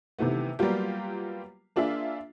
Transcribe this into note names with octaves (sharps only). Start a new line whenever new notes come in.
C3 D#3 E3 A3 B3
F#3 G3 A#3 B3 F4 G4
A#3 D4 F4 G#4 E5